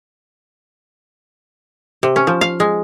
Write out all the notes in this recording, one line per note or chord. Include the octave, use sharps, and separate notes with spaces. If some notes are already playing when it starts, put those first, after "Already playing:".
C3
C#4
F3
F5
G#3